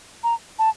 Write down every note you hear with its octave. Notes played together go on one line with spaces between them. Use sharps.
A#5
A5